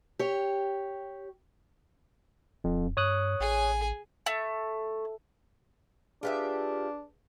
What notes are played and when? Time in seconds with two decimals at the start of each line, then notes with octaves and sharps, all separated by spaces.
0.19 G4 C#5
2.64 D1 F2
2.97 G2 C#5 D#6 F#6
3.40 A1 G#4 G#5
4.26 A3
6.23 D4 F4 G4 G#4 B4 E5